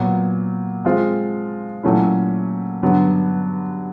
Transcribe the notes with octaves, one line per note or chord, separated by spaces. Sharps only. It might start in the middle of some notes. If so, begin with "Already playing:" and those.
Already playing: A#2 F#3 B3
F3 G#3 C4 F4
A#2 F#3 A3 C#4 E4
G2 D3 F#3 B3